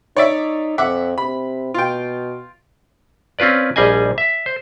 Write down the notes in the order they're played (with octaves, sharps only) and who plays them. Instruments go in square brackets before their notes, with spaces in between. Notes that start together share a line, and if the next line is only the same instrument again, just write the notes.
[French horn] D#4 [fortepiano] C#5 D5 E5
[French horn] F2 [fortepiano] E5 F#5 D6
[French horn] C3 [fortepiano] B5
[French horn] B2 [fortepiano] F4 G5
[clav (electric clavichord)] C4 C#4 F4 B4 D5
A#1 G3 G#4 D#5 G#5
E5
C5